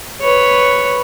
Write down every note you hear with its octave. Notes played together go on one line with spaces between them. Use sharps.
B4 C#5